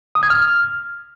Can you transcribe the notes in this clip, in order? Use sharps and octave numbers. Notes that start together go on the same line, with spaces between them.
D#6
G#6
F6